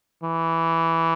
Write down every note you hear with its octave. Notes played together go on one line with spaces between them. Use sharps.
E3